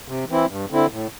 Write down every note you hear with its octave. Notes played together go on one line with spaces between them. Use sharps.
C3
E3 C4 E4
G2
D3 C4 E4
A2